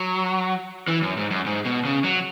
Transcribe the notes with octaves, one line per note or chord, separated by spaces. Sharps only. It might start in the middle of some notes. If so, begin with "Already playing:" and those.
Already playing: F#3
E3
F#2
G#2
F#2
G#2
B2
C#3
F#3